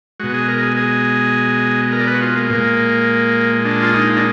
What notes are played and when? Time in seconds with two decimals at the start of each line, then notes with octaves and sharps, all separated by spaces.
0.20 B2 G#3 F#4
0.34 G#4
0.48 A#4
0.63 G#4
0.77 G#4
1.92 A#4
2.00 D5
2.07 B4
2.15 F#4
2.21 F4
2.36 A#3
2.50 A#2 G#3
3.65 D4
3.82 F4
3.94 D#4
4.16 D4